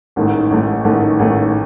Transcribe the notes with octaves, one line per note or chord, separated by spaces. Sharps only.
A1 G#2 D#3 A3
A1 G#2 D#3 A3
A1 G#2 D#3 A3
A1 G#2 D#3 A3